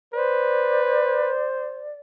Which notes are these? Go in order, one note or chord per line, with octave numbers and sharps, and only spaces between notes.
B4 C5 D5